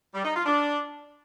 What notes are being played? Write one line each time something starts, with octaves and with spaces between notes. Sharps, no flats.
G3
D#4
F4
D4